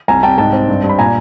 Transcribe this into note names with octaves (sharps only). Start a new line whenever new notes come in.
C2 G#5 A#5
C2 G5 A5
G#2 G5 A5
C4
G2
G2
B5
A#2 G#5 A#5